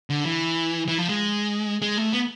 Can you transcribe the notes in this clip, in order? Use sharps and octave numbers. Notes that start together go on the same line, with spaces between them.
D3
E3
E3
F3
G#3
G#3
A3
B3